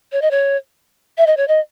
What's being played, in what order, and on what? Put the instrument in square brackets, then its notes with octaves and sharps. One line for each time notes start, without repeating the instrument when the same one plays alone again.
[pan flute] C#5
D#5
C#5
E5
D#5
C#5
D#5